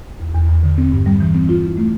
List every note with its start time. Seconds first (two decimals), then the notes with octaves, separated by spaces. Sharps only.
0.20 E2
0.34 E2
0.49 E2
0.63 D3
0.78 C4
0.92 G2
1.06 G3
1.20 E3
1.35 C4
1.49 F4
1.63 E4
1.77 A3